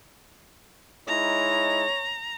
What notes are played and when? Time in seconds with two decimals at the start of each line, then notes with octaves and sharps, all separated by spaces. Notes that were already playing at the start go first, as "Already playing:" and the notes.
1.08 G#3 D#4 E4 C#5 A#5